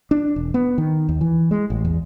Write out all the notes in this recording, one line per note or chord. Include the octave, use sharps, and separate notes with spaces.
D4
E1
B3
D#3
D#2
E3
G#3
A1
E2